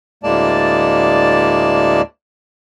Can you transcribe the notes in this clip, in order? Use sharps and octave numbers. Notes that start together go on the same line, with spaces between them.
D2 A2 G#3 A#3 D5 A5